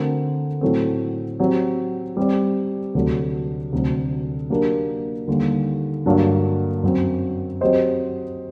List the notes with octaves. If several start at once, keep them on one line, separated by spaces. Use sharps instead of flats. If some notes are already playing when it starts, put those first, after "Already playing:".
Already playing: D3 A3 C4 F#4 A#4
A2 F#3 A3 C4
F#3 C4 G4
G3 C4 G4 D5
D2 C3 F#3 A3
D2 C3 F#3
F#3 A#3 D4 G4 A#4
D#2 D3 G3
G2 D3 F#3 A#3 D4
F#2 F#3 C4
F#3 C4 G4 C5 D#5